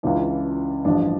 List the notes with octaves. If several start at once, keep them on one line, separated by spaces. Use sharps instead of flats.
C#2 C#3 E3 D4 F4
A1 G2 F3 D4